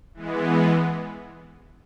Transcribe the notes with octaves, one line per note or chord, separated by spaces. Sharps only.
E3 G#3 B3